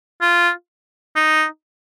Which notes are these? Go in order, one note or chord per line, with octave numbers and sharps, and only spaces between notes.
F4
D#4